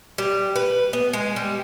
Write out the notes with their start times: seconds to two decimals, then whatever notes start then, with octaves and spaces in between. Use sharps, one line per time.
0.18 G3
0.56 B4
0.93 B3
1.13 G#3
1.36 G3